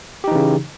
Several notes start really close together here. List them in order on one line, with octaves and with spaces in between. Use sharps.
G4 D#4 E3 C#3